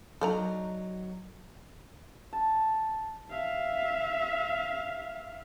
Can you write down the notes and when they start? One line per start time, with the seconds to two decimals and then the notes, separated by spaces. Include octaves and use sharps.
0.21 F#3 D#4 A4 D5 A#5
2.33 A5
3.30 E5 F5